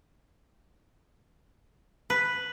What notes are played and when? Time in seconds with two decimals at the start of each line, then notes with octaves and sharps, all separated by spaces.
2.10 B4